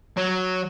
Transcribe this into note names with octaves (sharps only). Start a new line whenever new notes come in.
F#3